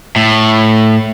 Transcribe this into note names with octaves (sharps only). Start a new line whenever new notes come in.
A2